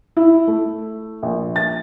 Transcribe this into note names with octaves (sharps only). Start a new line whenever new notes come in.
E4
A3
A#1
A6